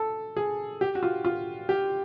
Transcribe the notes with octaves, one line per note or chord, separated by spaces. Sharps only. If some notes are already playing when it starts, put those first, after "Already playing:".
Already playing: A4
G#4
G4
F#4
F4
F4
G4